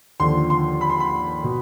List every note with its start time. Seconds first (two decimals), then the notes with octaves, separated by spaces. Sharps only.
0.20 D#2 D3 F3 C6
0.50 C6
0.81 B5
0.90 C6
1.00 B5
1.44 B2